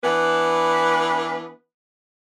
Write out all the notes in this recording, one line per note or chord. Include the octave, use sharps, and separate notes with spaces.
E3 B3 D4 B4